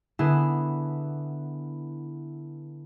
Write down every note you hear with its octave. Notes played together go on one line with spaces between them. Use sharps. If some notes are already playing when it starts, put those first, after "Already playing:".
D3 B3 E4 G#4